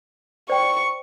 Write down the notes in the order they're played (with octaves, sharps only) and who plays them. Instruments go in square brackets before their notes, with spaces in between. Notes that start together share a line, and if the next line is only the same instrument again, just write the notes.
[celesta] C5 [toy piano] D5 G5 [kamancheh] C#6